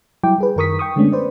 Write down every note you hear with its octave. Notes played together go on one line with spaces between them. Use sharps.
F#3 G3 E4 G5 D6
G3 G#4 B4
F#2 D#3 A#4 C#6 D#6 B6
G5 C#6 D#6
D3 G#3 A3 B3 C#4 D4
B4 C5 D5